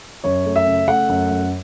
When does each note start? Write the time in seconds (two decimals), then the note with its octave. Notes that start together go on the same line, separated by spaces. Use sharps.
0.24 F#2 C#5
0.46 A3
0.56 E5
0.66 C#3
0.88 A3 F#5
1.09 F#2
1.31 F#2